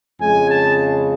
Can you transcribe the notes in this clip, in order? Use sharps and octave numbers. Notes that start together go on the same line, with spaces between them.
F2 C#3 G#3 G#5
A5